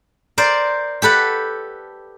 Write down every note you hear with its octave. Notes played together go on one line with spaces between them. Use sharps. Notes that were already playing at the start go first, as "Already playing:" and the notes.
A#4 C5 D5
G4 A4 B4 F#5